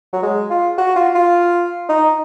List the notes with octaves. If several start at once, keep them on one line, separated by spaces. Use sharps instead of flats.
F#3
G#3
F4
F#4
F4
F4
D#4